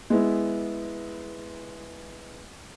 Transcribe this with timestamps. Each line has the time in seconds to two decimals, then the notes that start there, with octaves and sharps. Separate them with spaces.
0.10 G#3 B3 E4